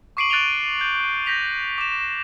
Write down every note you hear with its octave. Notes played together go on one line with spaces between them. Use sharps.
C#6 D6 C7 D7 D#7 F#7
F#6 A6 D7 D#7 F7 G7
G6
G6 A#6 B6 F7
D6 E7